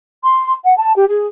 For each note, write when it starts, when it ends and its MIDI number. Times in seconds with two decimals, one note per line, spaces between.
0.22 0.53 84
0.64 0.76 78
0.76 0.92 81
0.95 1.05 67
1.08 1.26 68